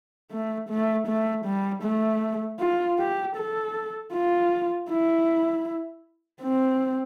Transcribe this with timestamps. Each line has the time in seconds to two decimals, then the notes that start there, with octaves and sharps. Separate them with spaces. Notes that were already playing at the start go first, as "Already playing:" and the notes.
0.31 A3
0.69 A3
1.08 A3
1.45 G3
1.83 A3
2.60 F4
2.99 G4
3.37 A4
4.13 F4
4.89 E4
6.42 C4